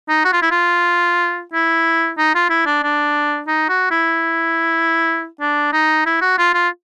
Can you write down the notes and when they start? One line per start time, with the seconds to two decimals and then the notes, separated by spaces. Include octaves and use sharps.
0.09 D#4
0.25 F#4
0.33 F4
0.42 E4
0.51 F4
1.53 E4
2.18 D#4
2.35 F4
2.50 E4
2.66 D4
2.83 D4
3.48 D#4
3.69 F#4
3.91 E4
5.41 D4
5.73 D#4
6.06 E4
6.21 F#4
6.38 F4
6.54 F4